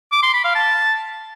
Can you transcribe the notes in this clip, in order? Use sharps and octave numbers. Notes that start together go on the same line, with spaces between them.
D6
C6
B5
F5
A5